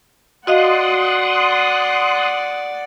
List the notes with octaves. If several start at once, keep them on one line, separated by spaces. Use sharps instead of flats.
F#4 D5 D#5 F5 F#5 C6 D#6 F#6